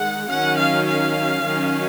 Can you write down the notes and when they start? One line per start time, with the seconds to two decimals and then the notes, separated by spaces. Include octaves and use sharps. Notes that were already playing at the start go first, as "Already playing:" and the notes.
Already playing: D#3 G#3 F#5
0.29 D#3 F#3 C#4 F#5
0.58 F5
0.87 F5
1.45 D#3 F#3 C#4